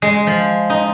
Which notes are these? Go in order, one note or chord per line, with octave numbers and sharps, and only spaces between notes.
G#3
F3
D#4